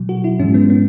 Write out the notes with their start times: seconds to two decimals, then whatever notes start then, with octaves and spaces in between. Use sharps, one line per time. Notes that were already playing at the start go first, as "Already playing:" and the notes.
Already playing: B2 F#3
0.09 F#4
0.24 E4
0.39 G#2 E3 G#3 C#4
0.54 B3
0.70 B3